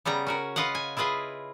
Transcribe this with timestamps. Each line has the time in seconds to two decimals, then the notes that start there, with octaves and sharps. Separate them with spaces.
0.05 C#3 G3 B3 A#5
0.27 C#4 F#4 A#4
0.56 F4 B4 D#5 F5 F#5
0.75 G#5
0.97 E4 F4 G#4 B4 D#5